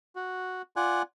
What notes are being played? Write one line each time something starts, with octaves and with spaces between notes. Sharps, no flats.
F#4
F4 D5 F#5 G#5 F#6